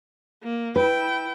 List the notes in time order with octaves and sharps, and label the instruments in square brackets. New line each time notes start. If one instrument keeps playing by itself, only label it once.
[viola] A#3
[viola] E4 G5 [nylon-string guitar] B4